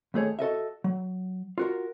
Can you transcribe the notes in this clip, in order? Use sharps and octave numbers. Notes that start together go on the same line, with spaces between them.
D#2 A3 G#4 C#5
F#4 A4 D#5 E5
F#3
F4 F#4 A#4